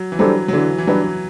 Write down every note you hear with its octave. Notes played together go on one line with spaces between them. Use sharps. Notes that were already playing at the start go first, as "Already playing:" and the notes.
Already playing: F#3
E3
F#3 G3 D4 A4 C5
F#3
D3 E3
E3
F#3 G3 D4 G4 B4